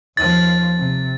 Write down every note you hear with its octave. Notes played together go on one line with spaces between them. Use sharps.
D#2 F3 A6
C3